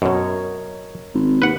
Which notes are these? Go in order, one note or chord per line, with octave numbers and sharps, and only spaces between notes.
F#2 B2 A#4 C#5 D#5
G#1
D#2 B4 F#5